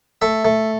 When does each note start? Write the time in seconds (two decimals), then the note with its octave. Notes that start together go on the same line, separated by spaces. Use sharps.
0.22 A3 E5
0.45 A3